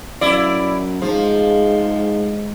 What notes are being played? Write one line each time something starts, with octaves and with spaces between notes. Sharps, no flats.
F#2 E4 D5
G#2 F3 G#3